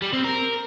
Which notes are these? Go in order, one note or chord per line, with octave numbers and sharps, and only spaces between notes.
G3
C4
A#4